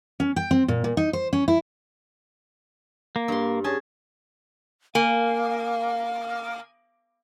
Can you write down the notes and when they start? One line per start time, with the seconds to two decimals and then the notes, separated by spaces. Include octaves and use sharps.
0.20 C#4
0.36 G5
0.51 C4
0.68 A#2
0.84 A#2
0.97 D#4
1.13 C5
1.33 C#4
1.48 E4
3.16 A#3
3.28 G2 C6
3.64 C#4 G#4 A5
4.95 A#3 F5 G#5